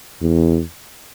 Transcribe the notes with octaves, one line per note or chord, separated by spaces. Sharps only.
E2